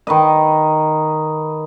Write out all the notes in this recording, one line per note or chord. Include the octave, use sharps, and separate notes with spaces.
D#3 B4 D#5